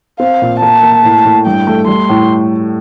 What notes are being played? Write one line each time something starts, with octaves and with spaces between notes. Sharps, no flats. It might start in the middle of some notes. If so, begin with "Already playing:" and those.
C4 F5
A#2
A#3 A5
A#3
A2
A2
G2 G5
A3
G3 C6
A2